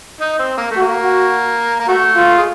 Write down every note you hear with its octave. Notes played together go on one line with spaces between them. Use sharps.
D#4
C4
A#3
A3
F#4
A#3
F#4
A#3
A3 F#4
F4
G#3